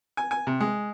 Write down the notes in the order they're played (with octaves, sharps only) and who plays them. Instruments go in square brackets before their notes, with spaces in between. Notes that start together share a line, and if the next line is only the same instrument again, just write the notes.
[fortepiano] G#5
G#5
C3
G#3